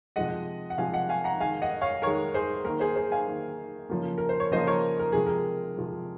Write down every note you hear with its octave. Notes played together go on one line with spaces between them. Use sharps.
C3 F3 G#3 D#5 F#5
F#5
C3 F3 G#3 F5 G#5
D#5 F#5
F5 G#5
F#5 A#5
D#3 G#3 F5 G#5
D#5 F#5
C#5 F5
D#3 G#3 A#4 C#5
G#4 C5
D#3 A#3 A#4
G#4 C5
G#4 C5
F5 G#5
D#3 A#3
C#3 F3 A#3
A#4
C5
C#5
C#3 F3 A#3 C5 D#5
A#4 C#5
A#4
C3 F3 G#3 G#4
A#4
C3 F3 G#3